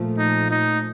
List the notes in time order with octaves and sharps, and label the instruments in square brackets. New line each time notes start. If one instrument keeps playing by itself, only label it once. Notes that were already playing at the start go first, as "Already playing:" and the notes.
Already playing: [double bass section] A#2 F3 A3
[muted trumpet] D#4
D#4